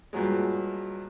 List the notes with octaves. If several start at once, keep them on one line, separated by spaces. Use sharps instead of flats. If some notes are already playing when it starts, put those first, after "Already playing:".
G2 A#2 F#3 G#3